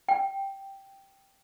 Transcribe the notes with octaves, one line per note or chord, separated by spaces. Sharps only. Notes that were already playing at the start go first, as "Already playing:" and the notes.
G5